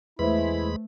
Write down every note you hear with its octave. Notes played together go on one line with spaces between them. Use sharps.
E2 G#3 A3 E4 B4 C5 B5